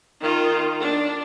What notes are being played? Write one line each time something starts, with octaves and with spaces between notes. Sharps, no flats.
D#3 F4
D4